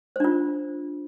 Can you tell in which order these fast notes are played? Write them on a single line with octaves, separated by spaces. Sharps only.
C5 D4 F4